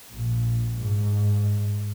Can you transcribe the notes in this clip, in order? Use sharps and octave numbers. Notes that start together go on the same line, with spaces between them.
A#1
G#2